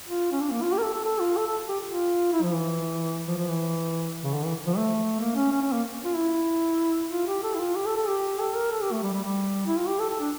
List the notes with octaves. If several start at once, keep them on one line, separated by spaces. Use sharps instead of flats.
F4
C#4
D4
A#3
F4
G4
A#4
A4
A4
A4
F4
A4
A4
G4
F4
E4
F3
E3
F3
F3
E3
C#3
D3
E3
F3
A3
A#3
C#4
C#4
C#4
A#3
F4
E4
F4
G4
A4
E4
F4
G4
A4
A4
G4
A4
A#4
A4
G4
A3
G3
G3
G3
E4
F4
G4
A4
A4
D4